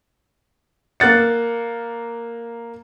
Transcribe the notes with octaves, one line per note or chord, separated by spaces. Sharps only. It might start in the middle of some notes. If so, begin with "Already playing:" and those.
A#3 A#4 F#6 A6 C#7